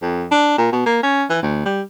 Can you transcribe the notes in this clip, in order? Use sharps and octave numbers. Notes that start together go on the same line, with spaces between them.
F2
D4
A#2
B2
A#3
C#4
E3
D2
G3